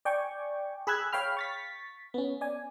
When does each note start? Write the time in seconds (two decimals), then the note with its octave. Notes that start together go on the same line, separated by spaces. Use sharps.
0.05 D5 G5 G#5 C#6
0.87 G#4 B5 E6 F#6 G#6
1.13 C#5 F5 G5 B5 F6
1.37 C#6 A6 B6
2.14 B3 C#4
2.41 D5 G#5